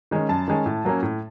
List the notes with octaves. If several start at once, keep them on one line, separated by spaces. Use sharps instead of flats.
D#3 G#3 C#4
F#2 A5
D#3 G#3 C#4
A2
F#3 A#3 C#4
A2